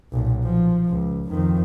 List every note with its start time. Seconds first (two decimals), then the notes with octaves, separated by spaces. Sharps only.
0.12 B1 A#2
0.43 F3
0.90 C#2
1.29 F2 D#3